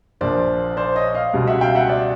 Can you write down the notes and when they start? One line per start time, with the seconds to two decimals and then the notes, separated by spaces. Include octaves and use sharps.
0.21 A#1 A#2 F3 C5 D5
0.77 C5 D5
0.96 C#5 D#5
1.14 D#5 F5
1.33 C#2 B2 G3
1.47 E5 F#5
1.61 F5 G5
1.75 E5 F#5
1.89 D5 E5